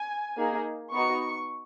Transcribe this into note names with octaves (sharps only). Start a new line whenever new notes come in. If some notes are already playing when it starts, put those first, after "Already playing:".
Already playing: G#5
A#3 D#4 G#4
B3 D#4 F#4 C#6